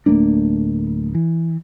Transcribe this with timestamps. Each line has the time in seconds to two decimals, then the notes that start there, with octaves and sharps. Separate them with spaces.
0.06 D1 A3 A#3 D4
1.15 E3